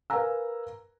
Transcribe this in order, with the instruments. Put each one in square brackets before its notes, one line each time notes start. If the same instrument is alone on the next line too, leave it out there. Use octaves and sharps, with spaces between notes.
[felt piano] A#4 B4 F5 G#5 A#5 E6